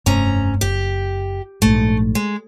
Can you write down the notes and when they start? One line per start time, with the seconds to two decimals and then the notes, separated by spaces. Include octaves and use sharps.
0.06 F1 G2 C3 A3 C#4 A#5
0.61 F#1 G4
1.62 A#1 G#2 A3
2.15 G#3